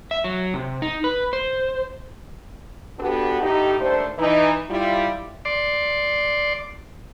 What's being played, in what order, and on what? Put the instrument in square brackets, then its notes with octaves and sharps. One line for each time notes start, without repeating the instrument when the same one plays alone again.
[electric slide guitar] E5
F#3
C3
D#4
B4
C5
[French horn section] B3 D4 F#4 G4 A4 B4
A2 D#4 G4
D#2 A3 D4 C5
E3 D#4
G3 E4 F4
[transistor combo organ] D5 C6